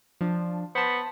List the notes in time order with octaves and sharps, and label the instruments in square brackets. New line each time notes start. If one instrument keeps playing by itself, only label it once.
[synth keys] F3 D4
[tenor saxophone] B3 [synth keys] C5 A5